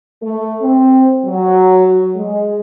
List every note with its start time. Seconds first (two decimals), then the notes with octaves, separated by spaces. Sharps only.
0.22 A3
0.62 C4
1.25 F#3
2.16 G#3